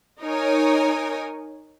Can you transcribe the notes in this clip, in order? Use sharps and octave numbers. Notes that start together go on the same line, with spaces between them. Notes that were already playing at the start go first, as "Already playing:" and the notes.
D#4 A#4 C#5 G#5